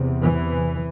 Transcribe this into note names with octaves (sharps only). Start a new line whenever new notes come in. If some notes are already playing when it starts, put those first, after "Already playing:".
Already playing: E2 C3
E3